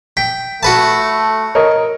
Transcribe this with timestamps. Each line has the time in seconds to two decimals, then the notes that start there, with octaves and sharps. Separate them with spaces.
0.17 G5 B6
0.63 A3 F#4 B4 A5
1.55 A#4 C#5 D#5